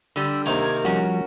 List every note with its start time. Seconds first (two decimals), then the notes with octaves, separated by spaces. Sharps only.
0.16 D3 G3 E6
0.46 C3 D#3 A#3 A#4 G#6
0.85 F3 G3 C#4 F#4